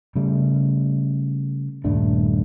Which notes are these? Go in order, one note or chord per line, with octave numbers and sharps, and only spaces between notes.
C#3 G3 A3
D#1 G2 A3 D4